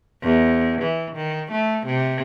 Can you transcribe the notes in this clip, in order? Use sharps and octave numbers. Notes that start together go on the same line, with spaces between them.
E2
E3
D#3
A3
C3